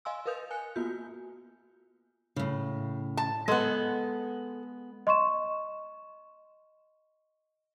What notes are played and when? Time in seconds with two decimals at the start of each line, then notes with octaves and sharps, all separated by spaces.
0.05 D#5 F5 G#5 C6 E6
0.26 A#4 B4 F5 D#6 G6 F7
0.51 G#5 F#6 C#7
0.76 A#3 B3 F4 F#4 G6
2.36 A2 C#3
3.17 A5
3.48 G#3 B3 A4 F#5
5.07 D#5 C6 C#6 E7